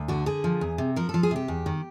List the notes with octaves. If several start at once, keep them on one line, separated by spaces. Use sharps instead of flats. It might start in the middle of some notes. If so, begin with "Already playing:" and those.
Already playing: D2
D3 F#4
D3 G#4
F3
E2
C3
F3 A#4
A4
F3
G#4
C3 G4
E2
D#3